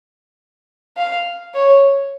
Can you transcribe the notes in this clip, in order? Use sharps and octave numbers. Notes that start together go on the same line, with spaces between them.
F5
C#5